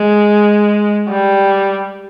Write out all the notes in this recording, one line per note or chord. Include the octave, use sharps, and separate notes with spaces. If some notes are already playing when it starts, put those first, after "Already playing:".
Already playing: G#3
G3